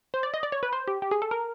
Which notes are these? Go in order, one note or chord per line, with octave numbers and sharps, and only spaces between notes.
C5
D5
D#5
D5
C#5
B4
C5
G4
G4
G#4
A4
A#4